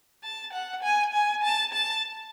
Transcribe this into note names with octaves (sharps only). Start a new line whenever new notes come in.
A5
F#5
G#5
G#5
A5
A5